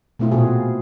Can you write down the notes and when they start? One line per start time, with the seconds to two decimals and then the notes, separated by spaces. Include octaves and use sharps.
0.19 B2 A3 C4 E4 F4
0.32 A#2 F4 F#4 G#4